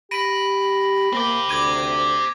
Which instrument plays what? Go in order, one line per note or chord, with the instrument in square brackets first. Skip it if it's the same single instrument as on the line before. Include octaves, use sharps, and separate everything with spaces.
[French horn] G4 [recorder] B5 [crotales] A#6 D7 D#7
[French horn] A#3 [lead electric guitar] C4 G4
[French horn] D2 [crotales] D6 G#6 D#7